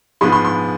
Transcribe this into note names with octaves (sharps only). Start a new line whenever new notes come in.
G#2 F3 G#3 B3 C6
C6
C6